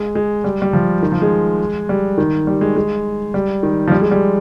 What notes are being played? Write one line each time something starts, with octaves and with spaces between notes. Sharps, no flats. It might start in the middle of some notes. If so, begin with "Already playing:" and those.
Already playing: G#3
G#3
G3
G3
F3
D#3
F3
G#3
G3
D#3
G3
G#3
G#3
G3
D#3
F3
G3
G#3
G3